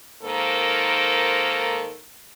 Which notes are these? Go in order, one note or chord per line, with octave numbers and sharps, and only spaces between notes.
G#2 D#3 A#3 A4 C5